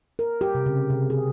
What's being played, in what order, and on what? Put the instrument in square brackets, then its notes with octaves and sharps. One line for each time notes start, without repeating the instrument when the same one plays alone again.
[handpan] A#4
G4
C3
C#3
C3
G#4